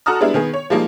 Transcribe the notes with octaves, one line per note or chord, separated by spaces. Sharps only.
F#4 A4 A5 A#5 D#6 F6
G3 G#3 B3 D4 E4
D#3 B3 G#4
C#5
F3 G3 G#3 A#3 D#4